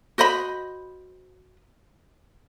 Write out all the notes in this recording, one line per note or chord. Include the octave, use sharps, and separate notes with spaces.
F#4 C5 D#5 B5